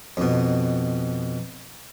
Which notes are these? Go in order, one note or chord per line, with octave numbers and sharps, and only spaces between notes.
F2 B2